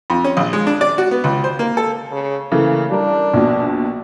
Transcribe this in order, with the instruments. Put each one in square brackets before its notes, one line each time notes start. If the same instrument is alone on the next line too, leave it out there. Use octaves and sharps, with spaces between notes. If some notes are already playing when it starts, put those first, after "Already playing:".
[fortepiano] F2
C#4
A#1
G#3
D4
D5
F#4
B3
C#2
C5
A#3
A4
[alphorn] C#3
[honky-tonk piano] C#3 E3 A3 [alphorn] A#3
[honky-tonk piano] G3 A#4 [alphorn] D4
[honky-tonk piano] A#1 B2